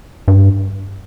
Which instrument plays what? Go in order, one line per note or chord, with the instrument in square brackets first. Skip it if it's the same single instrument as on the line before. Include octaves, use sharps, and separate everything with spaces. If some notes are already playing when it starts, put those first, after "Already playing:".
[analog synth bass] G2